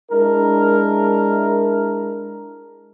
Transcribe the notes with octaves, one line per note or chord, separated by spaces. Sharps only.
G#3 D4 E4 A#4